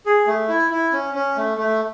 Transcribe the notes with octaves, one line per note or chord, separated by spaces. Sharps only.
G#4
A3
E4
E4
C#4
C#4
A3
A3